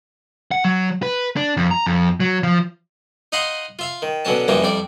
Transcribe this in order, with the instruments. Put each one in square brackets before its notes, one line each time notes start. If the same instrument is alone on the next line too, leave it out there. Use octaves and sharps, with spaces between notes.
[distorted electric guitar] F#5
F#3
B4
D4
F2
A#5
F2
F#3
F3
[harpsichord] D#4 D#5 F5 F#5 B5 C6
F4 E5 F5
D#3
B2 D3 F#3 C#4 A5
F#2 E3 F3 G3 A#3 C#4
F2 G3 E4 D5 D6